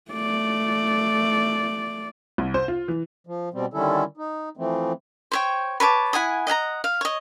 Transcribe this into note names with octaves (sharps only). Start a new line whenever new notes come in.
A3 D5
C2
C5
F4
E3
F3
B2 G3 C4
D3 D#3 G3 C#4 E4 A4
D#4
E3 F3 A3 C4
C5 C#5 G5
B4 C#5 A5 D6
E4 F#5 G#5 D#6
D#5 F#5 G#5 A#5
F5
C#5 D#5